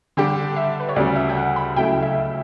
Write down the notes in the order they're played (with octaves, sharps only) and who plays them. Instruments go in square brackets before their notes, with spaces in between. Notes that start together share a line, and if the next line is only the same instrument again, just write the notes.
[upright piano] D3 G3 D4 G4 [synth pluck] G5
[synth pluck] E5
B4
C#5
[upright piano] D2 C#3 G3 [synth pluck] D5
[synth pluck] E5
G5
F#5
B5
[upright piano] C#2 C#3 F#3 A3 E4 [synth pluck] G5
[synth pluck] E5